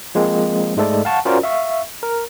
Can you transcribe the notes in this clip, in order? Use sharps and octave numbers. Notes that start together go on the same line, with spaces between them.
F3 G#3 A#3 C4
G#2 G#3 A3 A4 D5
F5 F#5 A5 C#6
C#4 F4 F#4 A#4 C5 D5
E5 F5 C#6
A#4